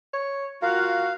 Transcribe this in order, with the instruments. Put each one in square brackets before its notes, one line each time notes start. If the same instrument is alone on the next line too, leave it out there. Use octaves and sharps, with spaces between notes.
[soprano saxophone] C#5
[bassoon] F4 [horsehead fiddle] F#4 F#5 [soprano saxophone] A#4 [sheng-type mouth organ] F5